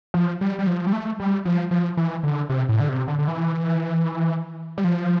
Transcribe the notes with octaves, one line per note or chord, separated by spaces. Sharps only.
F3
G3
G3
F3
G3
A3
G3
F3
F3
E3
D3
C3
A2
D3
C3
D3
D3
E3
G3
F3